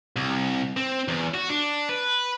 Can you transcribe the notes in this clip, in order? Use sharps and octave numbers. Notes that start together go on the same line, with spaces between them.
C2
C4
E2
F#4
D4
B4